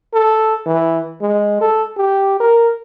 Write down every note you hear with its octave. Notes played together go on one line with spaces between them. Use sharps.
A4
E3
G#3
A4
G4
A#4